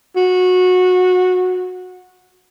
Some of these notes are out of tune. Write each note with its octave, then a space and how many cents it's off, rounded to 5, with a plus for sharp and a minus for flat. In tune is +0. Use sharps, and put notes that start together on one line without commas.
F#4 -20